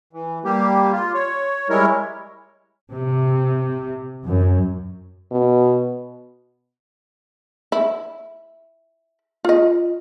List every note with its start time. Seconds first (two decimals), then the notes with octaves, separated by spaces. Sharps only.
0.13 E3
0.44 G3 A#3 G4
0.92 F4
1.14 C#5
1.70 G3 G#3 E4 A#4 C#5
2.92 C3
4.26 F#2
5.31 B2
7.72 E4
9.45 F4 D#5